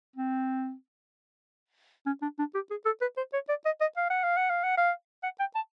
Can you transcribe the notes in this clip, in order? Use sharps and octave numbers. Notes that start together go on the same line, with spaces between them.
C4
C#4
D4
D4
G4
G#4
A4
B4
C5
C#5
D5
D#5
D#5
F5
F#5
F5
F#5
F5
F#5
F5
F#5
G5
A5